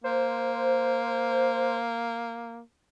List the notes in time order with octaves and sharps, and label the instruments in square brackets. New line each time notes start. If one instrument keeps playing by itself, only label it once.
[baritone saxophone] A#3 [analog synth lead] C5